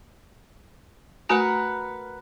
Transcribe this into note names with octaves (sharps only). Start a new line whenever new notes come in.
A3 F#4 A#4 B4 F#5 G#5